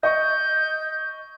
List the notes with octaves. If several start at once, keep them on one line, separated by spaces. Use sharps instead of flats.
D#5 C#6 G6